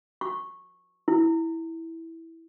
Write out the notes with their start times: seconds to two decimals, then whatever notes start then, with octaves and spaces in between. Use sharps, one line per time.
0.21 C#6
1.08 E4